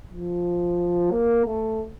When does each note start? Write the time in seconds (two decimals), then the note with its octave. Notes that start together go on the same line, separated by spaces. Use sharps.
0.10 F3
1.11 A#3
1.46 A3